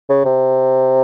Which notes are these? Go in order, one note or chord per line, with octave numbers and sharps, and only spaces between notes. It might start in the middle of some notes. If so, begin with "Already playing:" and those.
C#3
C3